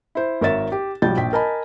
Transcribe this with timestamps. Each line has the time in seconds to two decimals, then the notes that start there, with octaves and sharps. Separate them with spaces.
0.15 E4 C5
0.41 G#1 A#4 C#5 E5 A6 E7
0.72 G4
1.02 B1 F3 G3 G6 A6
1.17 A#1 G5 B6
1.33 A#4 D#5 G#5 A5 B5